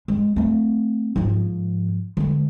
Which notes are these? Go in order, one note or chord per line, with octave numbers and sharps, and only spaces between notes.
G#3
A3 C4
G#2 F3
D3 G#3